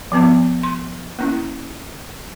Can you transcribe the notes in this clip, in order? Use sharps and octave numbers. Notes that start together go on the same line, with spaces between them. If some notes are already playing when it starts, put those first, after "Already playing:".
F3 B3 C4
C6
A#3 C#4 E4